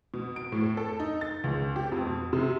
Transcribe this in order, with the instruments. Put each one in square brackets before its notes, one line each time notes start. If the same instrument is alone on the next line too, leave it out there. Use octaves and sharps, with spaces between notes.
[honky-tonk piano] B2
D7
A2
A4
D#4
A6
C#2
G4
F2
B2
C3